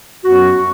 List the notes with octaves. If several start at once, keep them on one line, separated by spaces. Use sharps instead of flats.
F#2 F#3 B3 F#4